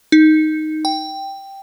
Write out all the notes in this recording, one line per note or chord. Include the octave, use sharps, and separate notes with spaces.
D#4
G5